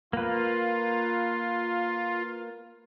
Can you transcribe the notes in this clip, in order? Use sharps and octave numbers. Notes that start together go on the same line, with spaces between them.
A#3 F4 B4